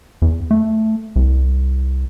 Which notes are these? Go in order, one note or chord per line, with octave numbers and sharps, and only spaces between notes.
E2
A3
C2